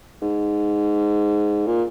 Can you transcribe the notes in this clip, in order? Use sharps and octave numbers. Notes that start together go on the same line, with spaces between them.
G#2
A#2